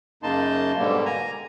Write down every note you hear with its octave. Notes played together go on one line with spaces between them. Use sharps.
F#2 C#3 A#3 D#4 A5 C6
G#2 B2 D3 G3 A#3
G#5 A#5